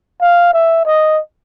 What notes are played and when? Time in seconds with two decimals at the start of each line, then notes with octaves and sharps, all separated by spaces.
0.21 F5
0.53 E5
0.86 D#5